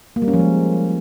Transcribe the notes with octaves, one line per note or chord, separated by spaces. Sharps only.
A#3
G3
C#4
F3
G#3